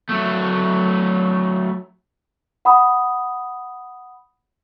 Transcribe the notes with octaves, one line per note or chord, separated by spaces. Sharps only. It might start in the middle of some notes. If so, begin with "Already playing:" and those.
F#3 A3
F#5 B5 D#6